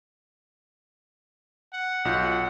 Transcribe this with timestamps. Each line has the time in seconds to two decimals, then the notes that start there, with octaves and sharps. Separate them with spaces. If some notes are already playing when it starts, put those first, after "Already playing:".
1.73 F#5
2.05 B1 F4 F#5 G6